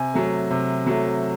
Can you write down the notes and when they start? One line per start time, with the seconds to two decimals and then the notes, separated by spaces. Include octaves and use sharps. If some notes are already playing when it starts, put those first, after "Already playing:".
Already playing: C3 G#5
0.14 F#3 A3
0.50 C3
0.86 F#3 A3